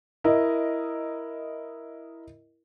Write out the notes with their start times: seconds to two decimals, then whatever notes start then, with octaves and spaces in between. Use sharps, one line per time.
0.24 E4 A#4 D#5